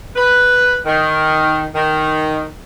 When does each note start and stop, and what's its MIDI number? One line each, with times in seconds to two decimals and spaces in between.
0.16 0.77 71
0.86 1.65 51
1.75 2.45 51